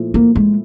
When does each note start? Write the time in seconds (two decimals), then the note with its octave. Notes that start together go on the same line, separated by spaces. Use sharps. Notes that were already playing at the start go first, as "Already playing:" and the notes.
Already playing: A#2 F3 A3 E4
0.14 A#3
0.35 G#3